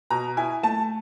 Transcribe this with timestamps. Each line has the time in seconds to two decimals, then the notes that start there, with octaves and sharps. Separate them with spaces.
0.10 B2 A#5
0.37 E4 G#5
0.63 A3 A5